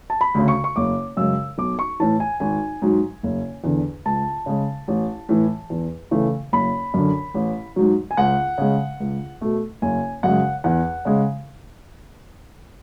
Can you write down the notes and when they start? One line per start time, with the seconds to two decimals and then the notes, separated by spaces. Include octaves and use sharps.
0.10 A5
0.21 B5
0.34 D2 C#3
0.48 C#6
0.64 C#6
0.76 F#1 D6
1.17 F#2 C#3 G#3 E6
1.58 B1 D6
1.79 C#6
2.00 A2 E3 A5
2.20 G#5
2.40 G#1 G#5
2.82 G#2 F#3
3.23 F#1
3.64 E2 D3
4.05 C#2 A5
4.46 C#3 G#3
4.88 A1
5.29 A2 E3
5.70 E2
6.11 C#3 E3 A3
6.53 F#1 B5
6.94 F#2 D3
7.34 A1
7.76 G#2 F#3
8.11 G#5
8.17 C#2 F#5
8.58 C#3 G#3
9.00 C#2
9.41 B2 A3
9.82 F#1 G#5
10.23 F#2 C#3 G#3 F#5
10.64 E2 F#5
11.05 C#3 G#3